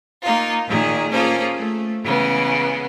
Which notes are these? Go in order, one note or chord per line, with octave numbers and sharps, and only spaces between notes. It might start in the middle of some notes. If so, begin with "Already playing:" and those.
A#3 D#4 F4
A#2 D#3 G#4
A#3 C#4 F4 G#4 A4 C5
A3
C#3 E3 G#3 B3